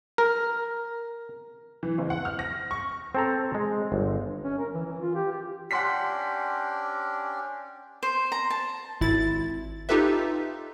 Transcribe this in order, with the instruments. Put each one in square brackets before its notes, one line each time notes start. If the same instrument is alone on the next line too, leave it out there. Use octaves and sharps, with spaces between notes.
[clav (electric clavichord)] A#4
[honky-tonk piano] E3
F#1
F#5
F6
A#6
C#6
[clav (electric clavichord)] C4 A4 A#5
G#3
G1
[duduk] C#4
A#4
E3
E3
F4
G4
G4
[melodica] C#4 D4 G4 [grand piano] F#5 C6 B6
[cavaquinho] C5
A#5
A5
[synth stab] G#1 E4 A6
D#4 F4 G4 A4 B4 E5